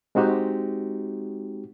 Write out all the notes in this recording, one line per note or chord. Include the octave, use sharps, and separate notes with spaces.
G#3 C4 D#4 F#4 G4